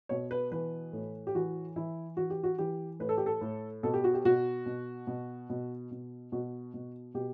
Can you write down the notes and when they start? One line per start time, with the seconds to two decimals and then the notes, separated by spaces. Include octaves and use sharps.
0.09 B2 C#5
0.31 B4
0.51 E3 B4
0.93 A2
1.27 G4
1.35 E3 F#4
1.76 E3 E4
2.17 E3 F#4
2.30 G4
2.43 F#4
2.58 E3 G4
3.00 A2 B4
3.09 A4
3.18 G4
3.26 A4
3.41 A2
3.83 B2 A4
3.94 G4
4.04 F#4
4.14 G4
4.25 B2 F#4
4.66 B2
5.07 B2
5.50 B2
5.91 B2
6.32 B2 F#4
6.74 B2
7.14 B2 G4